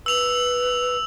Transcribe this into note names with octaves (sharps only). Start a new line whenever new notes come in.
B4 E6 F7